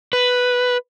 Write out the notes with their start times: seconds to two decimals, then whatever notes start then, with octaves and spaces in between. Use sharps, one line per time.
0.13 B4